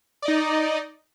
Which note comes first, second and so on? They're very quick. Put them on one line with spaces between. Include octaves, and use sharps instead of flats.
D5 D#5 D#4